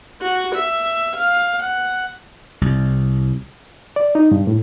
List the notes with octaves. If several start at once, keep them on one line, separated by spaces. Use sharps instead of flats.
F#4
E5
F5
F#5
C2
D5
D#4
G2
A2